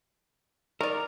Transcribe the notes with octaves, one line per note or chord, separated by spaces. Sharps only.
D#3 A#4 D5